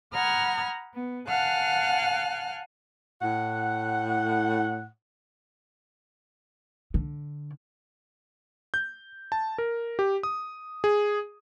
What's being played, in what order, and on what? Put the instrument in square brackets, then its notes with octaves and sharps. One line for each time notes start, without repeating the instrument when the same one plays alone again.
[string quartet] F#5 A#5 B5 D#6 F6 G#6
B3
F5 F#5 G#5 A5 F6 F#6
[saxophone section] A2 F#5
[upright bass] D3
[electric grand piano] G6
A5
A#4
G4
D#6
G#4